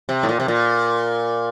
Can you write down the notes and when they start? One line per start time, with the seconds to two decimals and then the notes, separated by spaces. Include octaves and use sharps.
0.09 C3
0.23 A2
0.29 A#2
0.40 C3
0.48 A#2